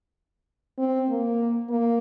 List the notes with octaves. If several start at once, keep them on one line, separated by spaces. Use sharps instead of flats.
C4
A#3
A#3